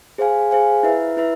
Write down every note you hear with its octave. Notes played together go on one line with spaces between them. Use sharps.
G#4 C5 F5 G#5
G#4 C5 F5 G#5
E4 B4 E5
E4 B4 E5